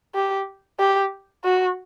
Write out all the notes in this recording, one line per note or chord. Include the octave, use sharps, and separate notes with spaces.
G4
G4
F#4